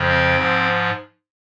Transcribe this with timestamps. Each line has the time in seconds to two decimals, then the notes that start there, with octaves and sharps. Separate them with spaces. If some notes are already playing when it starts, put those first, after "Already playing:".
Already playing: F2 C#3 F3
0.08 C4
0.37 G#2 F3